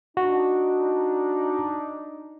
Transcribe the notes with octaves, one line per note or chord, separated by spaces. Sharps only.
D4 D#4 F#4